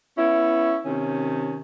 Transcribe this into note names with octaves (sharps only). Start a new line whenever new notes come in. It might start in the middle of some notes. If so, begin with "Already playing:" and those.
B3 C#4 E4
C3 D#3 C#4